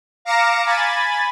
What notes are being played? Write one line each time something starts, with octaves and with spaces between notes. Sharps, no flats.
F5 A#5 D6 A#6 C#7 E7
G#5 B5 A6